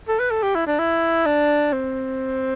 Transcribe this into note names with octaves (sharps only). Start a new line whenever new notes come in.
A4
B4
A4
G4
E4
D4
E4
D4
C4